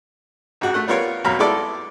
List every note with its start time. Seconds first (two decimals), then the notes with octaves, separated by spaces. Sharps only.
0.61 C#2 G#2 F#4
0.74 A3 F#5
0.88 G3 B3 F4 A#4 C#5
1.24 B1 F2 F#3 F5 A#5 B5
1.39 G#3 B3 E4 A4 D5